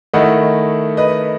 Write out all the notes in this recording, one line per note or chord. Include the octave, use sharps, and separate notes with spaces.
D#3 A3 E4 D#5 F#5
B4 D#5